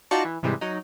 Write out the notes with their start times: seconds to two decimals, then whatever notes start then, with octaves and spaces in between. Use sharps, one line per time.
0.11 D#4 F4 F#4 D5 A5 C#6
0.25 E3
0.42 G#2 C3 E3 G3 G#3
0.61 F#3 D#4